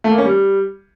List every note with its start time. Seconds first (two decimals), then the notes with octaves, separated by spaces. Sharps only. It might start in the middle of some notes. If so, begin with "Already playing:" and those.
0.04 A3
0.11 A#3
0.18 C#4
0.25 G3